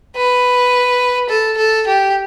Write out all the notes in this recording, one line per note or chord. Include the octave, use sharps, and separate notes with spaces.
B4
A4
A4
G4